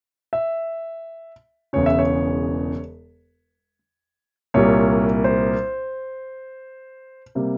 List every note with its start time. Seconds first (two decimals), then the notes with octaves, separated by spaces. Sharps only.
0.33 E5
1.73 E1 E2 C#3 C#5
1.86 E5
1.99 C#5
4.54 C2 A#2 G3 A#3 C#5
5.24 C5
7.35 C3 G3 A#3